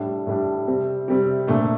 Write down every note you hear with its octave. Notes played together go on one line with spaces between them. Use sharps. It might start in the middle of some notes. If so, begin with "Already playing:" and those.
Already playing: A2 G3 D4
A2 G3 D4
C3 G3 C4
C3 G3 C4
A#2 A3 D4